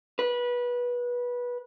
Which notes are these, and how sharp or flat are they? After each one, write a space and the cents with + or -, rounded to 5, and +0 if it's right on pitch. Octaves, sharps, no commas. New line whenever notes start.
B4 -20